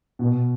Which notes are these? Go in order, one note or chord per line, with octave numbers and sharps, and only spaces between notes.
B2